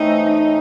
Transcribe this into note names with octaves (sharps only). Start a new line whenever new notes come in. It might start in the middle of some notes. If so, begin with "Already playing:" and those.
Already playing: A2 E3 A3 C4 D#4
D#4